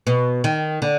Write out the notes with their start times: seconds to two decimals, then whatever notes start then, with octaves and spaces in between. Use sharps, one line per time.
0.07 B2
0.44 D#3
0.82 D3